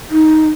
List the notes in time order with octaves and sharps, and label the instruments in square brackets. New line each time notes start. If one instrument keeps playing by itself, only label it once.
[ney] D#4